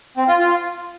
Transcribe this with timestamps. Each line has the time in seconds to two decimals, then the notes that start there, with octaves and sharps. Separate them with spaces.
0.17 C4
0.28 F4
0.39 F4